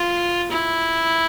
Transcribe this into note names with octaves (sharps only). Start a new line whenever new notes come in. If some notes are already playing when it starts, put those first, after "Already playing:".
Already playing: F4
E4